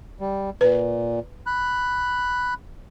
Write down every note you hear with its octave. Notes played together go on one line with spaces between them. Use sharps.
G3
A#2 B4
B5 F#6